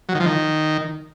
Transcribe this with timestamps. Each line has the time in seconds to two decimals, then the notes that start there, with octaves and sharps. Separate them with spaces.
0.09 F#3
0.14 D#3
0.20 F3
0.26 D#3